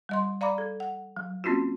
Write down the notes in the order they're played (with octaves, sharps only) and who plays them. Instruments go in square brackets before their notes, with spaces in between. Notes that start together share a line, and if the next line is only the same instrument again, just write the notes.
[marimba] G3 D#5 C6
D5 F5 A#5 B5 D6
A4
F#5
F#3
A#3 C4 C#4 F4 F#4